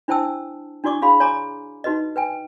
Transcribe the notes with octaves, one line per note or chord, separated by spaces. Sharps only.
D4 E4 C5 G5 A5 E6
D4 E4 F#4 D5 C#6 D6
D4 F#4 G#4 F5 B5
C#5 G#5 A#5 C6 D6
D#4 F#4 B4 D#5
B4 G5 G#5